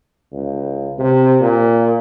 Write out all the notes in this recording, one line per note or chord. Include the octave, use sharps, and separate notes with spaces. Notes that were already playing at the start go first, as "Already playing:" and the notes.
C#2
C3
A#2